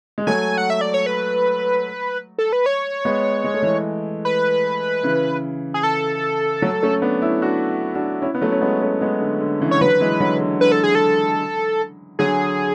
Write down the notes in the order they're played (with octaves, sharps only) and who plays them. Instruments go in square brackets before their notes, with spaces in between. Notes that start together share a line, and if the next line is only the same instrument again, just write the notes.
[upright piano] G#3
[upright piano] F#3 A3 [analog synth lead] G#5
[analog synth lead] F#5
E5
D5
C#5
B4
A4
B4
C#5
[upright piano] G#3 B3
G#3
A3
E3 G#3
[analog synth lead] B4
[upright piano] C#3 E3
[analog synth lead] G#4
A4
[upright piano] F#3 A3
A3 C#4
B3 D4
C#4 E4
D4 F#4
D4 F#4
C#4 E4
B3
F#3 A3
C#4
G#3 B3
A3 C#4
G#3 B3
D3
D3
C#3 E3
[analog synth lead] C#5
[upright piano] D3 F#3 [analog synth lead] B4
[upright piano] E3 G#3
D3 F#3
D3
[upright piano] D3 [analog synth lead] B4
[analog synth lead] A4
G#4
A4
[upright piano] D3 F#3 [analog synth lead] G#4